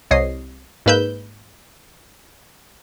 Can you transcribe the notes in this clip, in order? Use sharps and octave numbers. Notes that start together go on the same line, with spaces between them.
C2 C#5 D#5 C7
G#2 A#3 B4 E6 G6